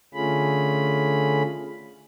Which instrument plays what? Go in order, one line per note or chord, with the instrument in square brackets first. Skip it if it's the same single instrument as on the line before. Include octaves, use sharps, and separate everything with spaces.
[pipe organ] D3 A3 C#4 F4 G#4 B5